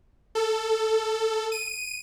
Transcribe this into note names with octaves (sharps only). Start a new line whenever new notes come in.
A4
D#7